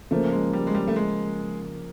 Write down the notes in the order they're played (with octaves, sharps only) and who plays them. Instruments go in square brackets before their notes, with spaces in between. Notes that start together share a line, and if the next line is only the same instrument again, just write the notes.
[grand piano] C#3 F3 A#3 [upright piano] A3
[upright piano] G#3
G3
G#3
G3
A3
G#3